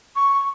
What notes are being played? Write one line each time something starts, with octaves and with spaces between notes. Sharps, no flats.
C#6